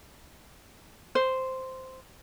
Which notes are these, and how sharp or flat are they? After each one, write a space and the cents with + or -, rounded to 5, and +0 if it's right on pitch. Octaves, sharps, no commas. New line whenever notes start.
C5 -5